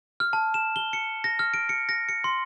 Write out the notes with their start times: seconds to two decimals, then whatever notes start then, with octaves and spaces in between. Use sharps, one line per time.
0.20 F6
0.33 A5
0.54 E7
0.76 G7
0.93 C#7
1.24 A#6
1.39 F6
1.54 D7
1.69 C#7
1.89 A#6
2.09 C#7
2.24 C6